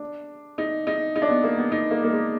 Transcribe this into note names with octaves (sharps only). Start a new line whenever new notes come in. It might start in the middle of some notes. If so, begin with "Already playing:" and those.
Already playing: D4
D#4
D#4
D#4
D4
B3
A#3
B3
D#4
A#3
A#3
G#3